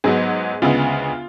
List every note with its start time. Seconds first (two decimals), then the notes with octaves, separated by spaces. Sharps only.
0.04 G#2 F#3 B3 G#4
0.62 D2 C#3 G#3 B3 F4